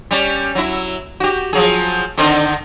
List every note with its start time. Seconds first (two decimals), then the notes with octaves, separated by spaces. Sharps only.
0.11 G3 C#4
0.55 F#3 E4
1.20 F#4 G4
1.53 F3 F#3 G#4
2.17 D3 D#3 C4